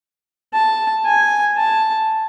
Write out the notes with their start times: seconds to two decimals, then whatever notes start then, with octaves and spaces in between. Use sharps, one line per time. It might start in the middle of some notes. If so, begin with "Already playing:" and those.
0.54 A5
1.06 G#5
1.57 A5